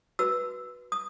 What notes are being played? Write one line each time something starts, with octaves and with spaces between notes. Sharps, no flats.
F#4 B4 E6
D#6